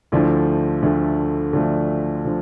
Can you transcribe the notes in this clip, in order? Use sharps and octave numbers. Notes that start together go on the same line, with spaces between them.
D2 D3 F3 A3 E4
D2 D3 F3 A3
D2 D3 F3 A3 D4
D3 F3